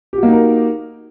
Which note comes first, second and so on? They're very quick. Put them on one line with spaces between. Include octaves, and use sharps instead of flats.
G4 F#4 A#3 D#4 A#4